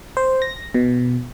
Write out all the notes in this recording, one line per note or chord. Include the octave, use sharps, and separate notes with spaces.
C5
A#6
B2